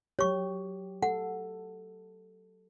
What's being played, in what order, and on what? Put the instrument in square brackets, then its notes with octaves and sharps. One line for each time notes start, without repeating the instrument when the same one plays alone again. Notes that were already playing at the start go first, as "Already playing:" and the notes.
[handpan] F#3 G4 [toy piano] C#5 C#6
[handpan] A4 [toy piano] F#5